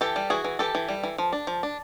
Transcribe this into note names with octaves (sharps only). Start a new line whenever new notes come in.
E3 G4 A4
G3
E3 F#4 G#4
E3
E3 G4 A4
E3
G3
E3
F3
D4
F3
D4